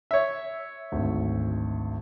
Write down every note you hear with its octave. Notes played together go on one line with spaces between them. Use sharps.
C#5 E5
G#1 D2